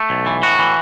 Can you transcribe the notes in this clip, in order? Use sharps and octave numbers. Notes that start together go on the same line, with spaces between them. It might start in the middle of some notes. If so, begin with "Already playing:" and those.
Already playing: A3
B1
E3
A2 F#4
E3